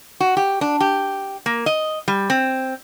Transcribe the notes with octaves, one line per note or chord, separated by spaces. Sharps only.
F#4
G4
D4
G4
A#3
D#5
G3
C4